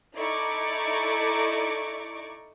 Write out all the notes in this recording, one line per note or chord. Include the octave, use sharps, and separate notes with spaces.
D#4 E4 A4 D5 C#6 D6